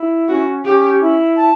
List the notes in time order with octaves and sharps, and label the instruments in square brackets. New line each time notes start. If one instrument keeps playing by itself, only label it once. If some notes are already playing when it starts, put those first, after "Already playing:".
Already playing: [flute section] E4
[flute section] C#4 [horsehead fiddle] F#4
[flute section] C#4 [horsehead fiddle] G4
[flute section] E4
A5